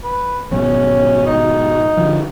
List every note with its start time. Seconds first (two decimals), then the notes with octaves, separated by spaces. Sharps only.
0.04 B4
0.51 G#1 B2 F#3 C#4
1.26 D#4
1.97 D3 F3